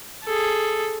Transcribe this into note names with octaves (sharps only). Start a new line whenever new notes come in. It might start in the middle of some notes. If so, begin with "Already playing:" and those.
G#4 A4